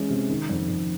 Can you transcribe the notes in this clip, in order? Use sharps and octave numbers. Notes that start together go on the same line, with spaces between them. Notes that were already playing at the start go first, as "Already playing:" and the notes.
Already playing: E3 G#3 C#4
C3
D#3
F2
F2